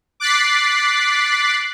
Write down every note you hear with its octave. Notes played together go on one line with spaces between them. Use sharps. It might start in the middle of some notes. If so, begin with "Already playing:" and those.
D6 F#6 A6 B6 C7